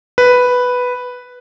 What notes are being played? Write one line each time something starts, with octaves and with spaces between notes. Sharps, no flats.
B4